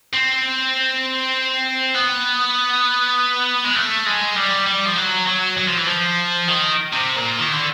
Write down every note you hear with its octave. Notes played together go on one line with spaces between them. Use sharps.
C4
B3
G#3
A3
G#3
G3
G3
F3
F#3
F#3
F#3
F3
E3
F3
D#3
C3
A#2
D#3
D3